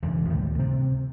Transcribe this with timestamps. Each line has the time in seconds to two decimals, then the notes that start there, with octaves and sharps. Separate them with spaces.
0.02 E1 C#2 D3 E3
0.29 D2 A2 D#3 G3
0.58 C3 C4